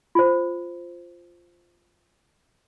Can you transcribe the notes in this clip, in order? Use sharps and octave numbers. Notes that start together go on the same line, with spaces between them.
F4 C5